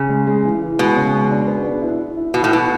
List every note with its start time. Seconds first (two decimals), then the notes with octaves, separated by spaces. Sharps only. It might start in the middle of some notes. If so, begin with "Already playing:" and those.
Already playing: C#3
0.09 G#3
0.27 G#3
0.44 E3
0.62 E3
0.79 B2 G#3
0.96 C#3
1.13 G#3
1.31 D4
1.48 B3
1.65 D4
1.82 E4
1.99 E4
2.17 E4
2.34 B2 F#4
2.44 A2
2.51 B2 F#4